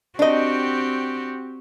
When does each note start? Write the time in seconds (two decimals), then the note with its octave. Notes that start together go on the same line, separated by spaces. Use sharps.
0.19 C4 D4 F#4 G4 D#5